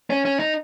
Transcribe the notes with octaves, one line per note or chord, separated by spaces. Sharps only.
C#4
C#4
D#4